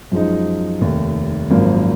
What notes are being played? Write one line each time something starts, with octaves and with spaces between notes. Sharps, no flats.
F#2 F3 G#3 D#4
F1 D#2 D#3
G#1 F#2 F3 A#3